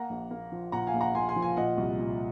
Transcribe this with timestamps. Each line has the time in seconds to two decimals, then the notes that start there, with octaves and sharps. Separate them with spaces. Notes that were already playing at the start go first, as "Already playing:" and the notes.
Already playing: A#3 F#5 A#5
0.10 A#1
0.31 A#3
0.52 F3
0.72 A#2 F#5 A#5
0.87 F5 G#5
0.94 A#1
1.01 F#5 A#5
1.15 A#1 G#5 C6
1.29 G#5 C6
1.36 F3
1.42 F5 G#5
1.57 A#2 D#5 F#5
1.78 C2
1.99 A#2